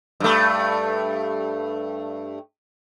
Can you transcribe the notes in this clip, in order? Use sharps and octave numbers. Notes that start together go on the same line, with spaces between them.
G2 A3